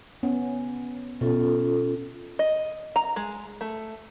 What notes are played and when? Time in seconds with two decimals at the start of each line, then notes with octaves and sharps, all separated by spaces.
0.23 B3 C#4
1.21 B2 C#4 F4 A4
2.39 D#5
2.96 A#5
3.16 G#3
3.61 A3